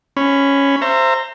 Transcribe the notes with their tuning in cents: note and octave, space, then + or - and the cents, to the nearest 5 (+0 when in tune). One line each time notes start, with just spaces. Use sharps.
C#4 +0 B5 +15
C5 +0 E5 +30 A#5 -20